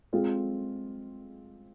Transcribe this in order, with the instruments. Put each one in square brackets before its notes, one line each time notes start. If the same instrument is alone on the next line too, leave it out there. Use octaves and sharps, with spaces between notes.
[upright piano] G#3 C4 F4 G#4